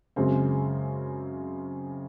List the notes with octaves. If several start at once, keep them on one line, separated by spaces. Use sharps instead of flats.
F#2 C#3 G#3 C4